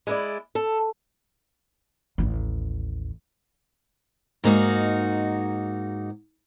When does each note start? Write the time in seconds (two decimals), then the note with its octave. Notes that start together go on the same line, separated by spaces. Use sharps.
0.07 G#3 E4 D5
0.55 A4
2.18 A1 D#2
4.44 G#2 A#3 D#4 F#4